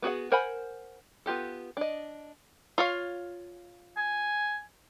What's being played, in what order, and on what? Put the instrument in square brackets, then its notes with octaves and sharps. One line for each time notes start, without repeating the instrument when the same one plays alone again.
[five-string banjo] B3 F#4 G#4 F#5
A#4 C5 F#5 G#5 B5
B3 F4 G4 A4
D4 D#5
F4 C#5 F5
[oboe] G#5